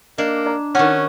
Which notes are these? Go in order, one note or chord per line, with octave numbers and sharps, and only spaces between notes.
A#3 D4 D#5
D5 A#5
D#3 C#4 F#4 F#5